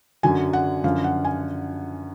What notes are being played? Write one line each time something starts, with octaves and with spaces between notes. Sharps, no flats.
F#2 D3 F#3 G#5
F#5
F#2 D3 F3 F5
F#5
G#5